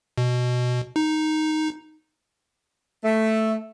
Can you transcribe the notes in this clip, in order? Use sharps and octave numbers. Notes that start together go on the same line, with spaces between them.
B2
D#4
A3